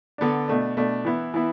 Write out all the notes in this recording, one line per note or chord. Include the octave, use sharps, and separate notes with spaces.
D3 B3 D4
B2 A3 D4
B2 A3 D4
E3 B3 E4
E3 B3 E4